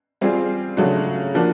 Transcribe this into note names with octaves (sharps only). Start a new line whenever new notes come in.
G3 C4 F4 G#4
C#3 F#3 A3 D4 F#4
F3 A#3 D4 F#4